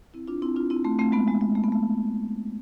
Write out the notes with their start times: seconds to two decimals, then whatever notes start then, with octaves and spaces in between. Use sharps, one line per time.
0.14 C4 E4
0.28 D4 F4
0.42 C4 E4
0.56 D4 F4
0.70 C4 E4
0.85 A3 C4
0.99 A3 C4
1.12 G#3 B3
1.28 G#3
1.41 G#3
1.55 A3
1.64 B3
1.72 A3